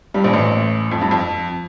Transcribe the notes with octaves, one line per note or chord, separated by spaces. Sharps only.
G2 G3
A#1 A#2
A1 A2
F2
G2
F2